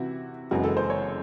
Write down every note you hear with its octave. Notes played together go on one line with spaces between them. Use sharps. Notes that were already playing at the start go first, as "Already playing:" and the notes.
Already playing: C3 E3 E4 F#4
F#1 F#2 E3 G#3 F#4
A4
C5
C#5